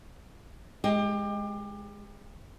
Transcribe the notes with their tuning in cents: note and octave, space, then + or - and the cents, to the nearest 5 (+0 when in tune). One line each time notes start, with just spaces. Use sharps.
G#3 +0 G4 +25